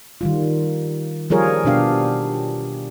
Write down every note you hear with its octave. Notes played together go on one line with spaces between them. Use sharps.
D#3 G3 F4
F3 G3 F4 G#4 A#4 C#5
B2 B3 D4 G4 F5